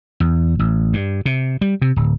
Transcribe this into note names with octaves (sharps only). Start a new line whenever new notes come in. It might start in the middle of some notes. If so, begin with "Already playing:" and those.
E2
A1
G2
C3
G3
C3
D1